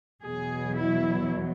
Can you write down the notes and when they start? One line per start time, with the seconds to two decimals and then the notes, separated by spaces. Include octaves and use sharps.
0.24 E2 B2 F#3 G#4
0.79 E4